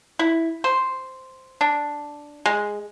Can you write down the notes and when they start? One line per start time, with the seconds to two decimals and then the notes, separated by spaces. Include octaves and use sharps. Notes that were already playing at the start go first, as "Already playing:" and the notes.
0.19 E4
0.64 C5
1.61 D4
2.46 G#3